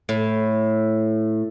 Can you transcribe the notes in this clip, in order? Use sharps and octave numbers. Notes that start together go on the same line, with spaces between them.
A2